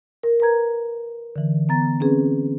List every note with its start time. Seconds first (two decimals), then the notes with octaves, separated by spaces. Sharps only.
0.23 A#4
0.40 A#4 B4 A#5 G#6
1.36 D3 E3
1.69 B3 A#5 A6
2.00 C4 C#4 G#4 B4